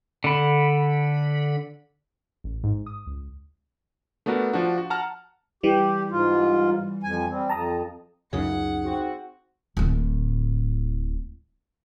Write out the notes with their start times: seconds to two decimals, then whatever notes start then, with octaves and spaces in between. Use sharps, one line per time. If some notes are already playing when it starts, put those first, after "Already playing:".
0.24 D3 B5
2.44 A1
2.64 G#2
2.86 D#6
3.06 C#2
4.26 A3 B3 D4 F#4 A#4
4.53 F3 D4 F#4
4.78 F#4
4.90 F#5 A5 A#5 F6
5.63 E3 G3 G4
6.11 G#2 F4
7.03 F2 G#5
7.30 G3 C4
7.50 F2 A5 A#5 D#6
8.33 C#2 F#2 C#3 D#4 G#4 F#5
8.84 C4 F#4
9.77 D1 A2